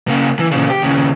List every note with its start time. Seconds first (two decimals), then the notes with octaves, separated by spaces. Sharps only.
0.08 C#3 A#3
0.39 E3
0.51 A#2 C#3
0.70 G4
0.82 D#2 C#3